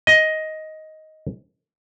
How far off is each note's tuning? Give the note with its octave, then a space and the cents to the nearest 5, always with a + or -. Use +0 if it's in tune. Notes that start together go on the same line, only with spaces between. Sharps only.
D#5 +10